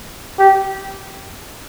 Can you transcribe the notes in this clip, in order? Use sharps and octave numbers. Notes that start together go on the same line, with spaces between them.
G4